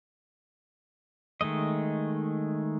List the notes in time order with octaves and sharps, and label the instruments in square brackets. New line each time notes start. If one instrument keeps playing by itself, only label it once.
[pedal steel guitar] D#3 G#3 A3 D#5